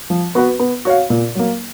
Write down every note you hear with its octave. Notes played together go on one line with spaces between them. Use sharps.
F3
B3 F#4 B4
B3
F#4 C#5 F5
A#2
F#3 A#3